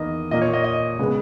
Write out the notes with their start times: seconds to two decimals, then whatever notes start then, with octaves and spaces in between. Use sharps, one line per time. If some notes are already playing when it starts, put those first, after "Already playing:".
Already playing: E2 D#3 A#3 D#5
0.31 A#2 A#3 D#5
0.42 C#5
0.53 D#5
0.64 D#5
0.98 C#3 G#3 B3